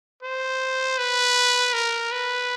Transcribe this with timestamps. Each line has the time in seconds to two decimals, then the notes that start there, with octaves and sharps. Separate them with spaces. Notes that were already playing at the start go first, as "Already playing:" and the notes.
0.23 C5
0.98 B4
1.74 A#4
2.12 B4